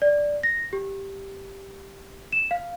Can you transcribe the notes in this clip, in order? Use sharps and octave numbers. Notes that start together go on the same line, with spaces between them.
D5
A#6
G4
E7
F5